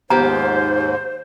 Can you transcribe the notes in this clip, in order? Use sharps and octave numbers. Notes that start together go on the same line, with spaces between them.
D#2 G#2 F3 B3 G4 C5 A#5